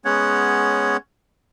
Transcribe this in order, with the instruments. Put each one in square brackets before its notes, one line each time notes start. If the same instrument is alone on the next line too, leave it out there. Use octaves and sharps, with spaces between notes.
[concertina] G#3 B3 C#4 C#5 F#5